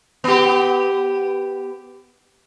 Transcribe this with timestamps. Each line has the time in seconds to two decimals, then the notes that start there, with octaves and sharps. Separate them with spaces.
0.24 B3 G4